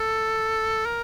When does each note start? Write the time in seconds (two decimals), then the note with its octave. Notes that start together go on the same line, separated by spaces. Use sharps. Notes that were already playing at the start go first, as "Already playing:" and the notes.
Already playing: A4
0.85 A#4